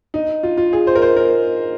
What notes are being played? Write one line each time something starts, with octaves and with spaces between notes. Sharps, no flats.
D#4
F4
F4
G#4
C5
A#4
C5
A#4